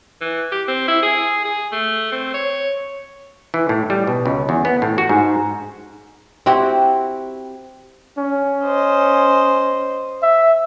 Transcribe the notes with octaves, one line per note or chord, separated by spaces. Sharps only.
E3
G4
C4
E4
G#4
G#4
A3
C4
C#5
E3
A2
G3
B2
C#2
E2
B3
A2
F#4
G#2
C4 E4 F#4 G4
C#4
C5 D#5
E5